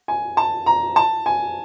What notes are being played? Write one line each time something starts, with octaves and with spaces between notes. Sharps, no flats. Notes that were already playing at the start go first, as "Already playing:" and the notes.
G#5
A5
A#5
A5
G#5